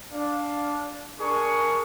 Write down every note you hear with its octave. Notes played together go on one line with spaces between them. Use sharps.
D4 F5
D4 G#4 A#4 C#6